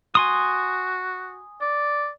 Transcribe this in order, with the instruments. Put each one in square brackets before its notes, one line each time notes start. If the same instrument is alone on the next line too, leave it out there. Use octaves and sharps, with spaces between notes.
[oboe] F#4 [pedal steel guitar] G#5 C6 D#6
[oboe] D5